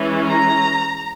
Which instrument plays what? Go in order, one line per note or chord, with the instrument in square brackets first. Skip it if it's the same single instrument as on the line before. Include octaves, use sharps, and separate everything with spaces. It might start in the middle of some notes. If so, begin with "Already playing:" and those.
Already playing: [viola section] E3 G#3 C#4
A#5